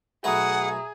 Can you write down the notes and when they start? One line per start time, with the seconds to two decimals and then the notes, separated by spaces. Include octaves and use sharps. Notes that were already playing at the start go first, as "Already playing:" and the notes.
0.24 B1 A3 G#4 B4 E5 F#5 A#5 D#6